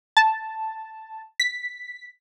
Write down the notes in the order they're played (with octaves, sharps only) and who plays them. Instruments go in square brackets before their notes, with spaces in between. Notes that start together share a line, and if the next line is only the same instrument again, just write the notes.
[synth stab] A5
B6